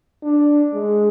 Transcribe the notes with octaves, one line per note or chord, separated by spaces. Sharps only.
D4
G#3